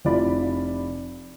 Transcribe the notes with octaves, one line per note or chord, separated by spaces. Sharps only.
F1 E4 F4 D5 B5